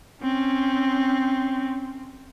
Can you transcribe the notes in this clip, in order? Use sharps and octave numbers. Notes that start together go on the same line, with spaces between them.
C4 C#4